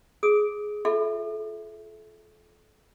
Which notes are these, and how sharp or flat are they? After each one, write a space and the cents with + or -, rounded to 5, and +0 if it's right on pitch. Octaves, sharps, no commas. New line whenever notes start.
G#4 +10 D#6 +30
F4 +0 A4 -30 E5 +0